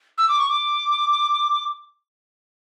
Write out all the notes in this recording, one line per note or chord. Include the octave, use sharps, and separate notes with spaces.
E6
D6
C#6
D6